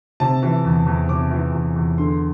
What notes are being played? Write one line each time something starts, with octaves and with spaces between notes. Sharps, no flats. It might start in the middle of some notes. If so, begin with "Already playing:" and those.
C3 A5
E3
E2
E2
C3 D6
E3
E2
E2
D3 C6